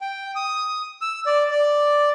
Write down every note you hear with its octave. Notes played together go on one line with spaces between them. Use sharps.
G5
D#6
E6
D5
D5